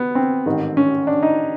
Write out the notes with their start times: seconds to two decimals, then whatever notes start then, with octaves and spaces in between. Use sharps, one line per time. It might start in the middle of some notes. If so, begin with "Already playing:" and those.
Already playing: B3
0.15 C4
0.46 A1 G#2 D#3
0.77 C#4
1.07 D4
1.23 D#4